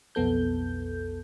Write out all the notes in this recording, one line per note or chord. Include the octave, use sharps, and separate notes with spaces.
B1 F2 B3 A4 G6